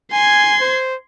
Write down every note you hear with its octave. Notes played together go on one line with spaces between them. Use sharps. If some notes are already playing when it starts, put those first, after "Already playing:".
G#5 C6 G#6
C5